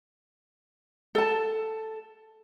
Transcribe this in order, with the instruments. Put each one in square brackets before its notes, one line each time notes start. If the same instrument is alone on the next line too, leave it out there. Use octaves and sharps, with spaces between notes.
[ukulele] A4 A5